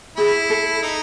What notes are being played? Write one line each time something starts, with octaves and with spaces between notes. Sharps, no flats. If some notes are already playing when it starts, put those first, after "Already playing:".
E4 G#4
A4
D#4